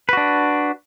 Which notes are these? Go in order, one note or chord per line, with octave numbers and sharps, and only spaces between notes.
D4 F#4 B4